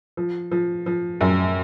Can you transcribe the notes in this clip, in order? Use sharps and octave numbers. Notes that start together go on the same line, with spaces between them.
F3
F3
F3
F#2